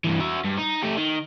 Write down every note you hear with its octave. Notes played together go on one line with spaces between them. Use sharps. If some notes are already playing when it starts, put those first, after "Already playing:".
G2 E3
F#4 E5
G2
D#4
A3 G4
D#3